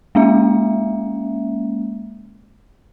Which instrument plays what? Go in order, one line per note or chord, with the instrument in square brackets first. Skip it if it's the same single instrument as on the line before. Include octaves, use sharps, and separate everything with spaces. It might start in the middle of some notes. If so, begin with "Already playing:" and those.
[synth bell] G#3 A#3 C#4 E5